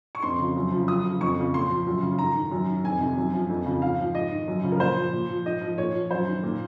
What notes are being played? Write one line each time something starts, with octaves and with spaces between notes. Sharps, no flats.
C#6
F2 C6
C#3 F3
F#2
C#3 F3
F#2 D#6
C#3 F3
F2 C#6
C#3 F3
A#2 C6
F3
F#2
C#3 F3
G#2 A#5
D#3
F#2
D#3
F2 G#5
C3 D#3
F#2
F3
F2
C#3 F3
G#2 F5
F3
G#2 D#5
D#3
F#2
C#3 F3
A#4
A#2 C5
F3
A#2
F3
G#2 D#5
F3
A#2 C#5
F3
F#2 C5
D#3
A#2